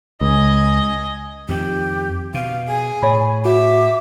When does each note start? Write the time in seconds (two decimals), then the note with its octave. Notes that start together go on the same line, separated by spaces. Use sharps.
0.21 C#2 D#5 G#5
1.49 F2 D#3 G4
2.34 B2 F5
2.67 G#4 G#5
3.02 A2 C#5 B5
3.45 F#4 E5 D6